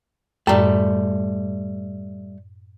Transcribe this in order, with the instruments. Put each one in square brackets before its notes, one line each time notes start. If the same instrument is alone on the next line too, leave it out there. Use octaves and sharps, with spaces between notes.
[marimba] F#2 A2 [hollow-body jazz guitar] G3 A3